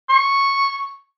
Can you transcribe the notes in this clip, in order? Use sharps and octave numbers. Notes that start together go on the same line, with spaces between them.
C#6